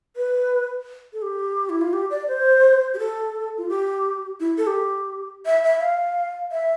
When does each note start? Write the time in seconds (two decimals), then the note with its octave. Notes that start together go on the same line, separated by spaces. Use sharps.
0.16 B4
1.13 A4
1.22 G4
1.70 E4
1.81 F4
1.93 G4
2.11 D5
2.28 C5
2.94 G4
2.99 A4
3.58 F4
3.69 G4
4.40 E4
4.58 A4
4.67 G4
5.46 E5
5.64 E5
5.81 F5
6.52 E5